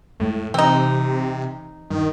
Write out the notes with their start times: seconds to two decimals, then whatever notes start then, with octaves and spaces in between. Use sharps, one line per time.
0.20 F2 A2 G#3 A3
0.54 C3 E3 C4 D#4
1.90 D#1 G2 D#3